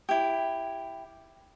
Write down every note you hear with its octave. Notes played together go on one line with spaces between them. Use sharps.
E4 G4